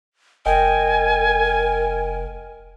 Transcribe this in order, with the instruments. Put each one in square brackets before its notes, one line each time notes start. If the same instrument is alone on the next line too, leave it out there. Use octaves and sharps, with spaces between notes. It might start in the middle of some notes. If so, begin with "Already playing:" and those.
[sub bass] F1 [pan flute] A#4 [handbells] D#5 G5 [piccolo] G#5